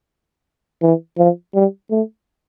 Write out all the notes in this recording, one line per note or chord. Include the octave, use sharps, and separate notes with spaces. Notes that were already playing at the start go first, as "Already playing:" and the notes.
E3
F3
G3
A3